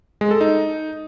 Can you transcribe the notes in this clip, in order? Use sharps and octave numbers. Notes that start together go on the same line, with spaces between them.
G#3
A4
D#4